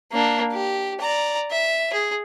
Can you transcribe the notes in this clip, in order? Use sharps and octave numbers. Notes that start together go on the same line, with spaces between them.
A#3 D4
G4
D5 A#5
E5
G#4